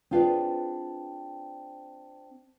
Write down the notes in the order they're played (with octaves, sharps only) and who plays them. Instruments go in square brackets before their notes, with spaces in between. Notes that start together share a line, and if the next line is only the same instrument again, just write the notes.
[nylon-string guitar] C4 D4 F4 G#4 B4 D5